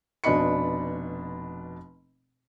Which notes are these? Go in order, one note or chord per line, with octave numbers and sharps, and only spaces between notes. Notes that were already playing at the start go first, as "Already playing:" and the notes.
F1 B2 D4 D#5 B5 C#7